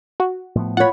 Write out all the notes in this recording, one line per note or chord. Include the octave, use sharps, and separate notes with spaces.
F#4
A2 F3 B3
F4 C#5 F#5 B5